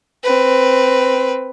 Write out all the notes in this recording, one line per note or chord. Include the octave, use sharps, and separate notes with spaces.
C4 B4